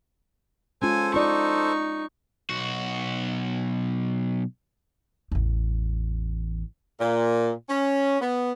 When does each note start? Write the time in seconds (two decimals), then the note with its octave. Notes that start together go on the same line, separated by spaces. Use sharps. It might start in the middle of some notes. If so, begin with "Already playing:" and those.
0.82 G#3 C#4 F4 A4 C5 G#5
1.14 D#4 F4 D5 C#6
2.50 B1 F#4
5.32 A1 E2
7.00 A#2
7.69 C#4
8.20 B3